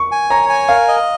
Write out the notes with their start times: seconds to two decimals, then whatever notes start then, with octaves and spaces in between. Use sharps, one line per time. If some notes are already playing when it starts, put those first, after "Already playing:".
Already playing: C#6
0.12 G#5
0.30 C#5 A#5
0.49 G#5
0.69 A#4 F5
0.88 D#5